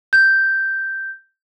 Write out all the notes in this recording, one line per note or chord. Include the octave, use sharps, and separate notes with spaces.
G6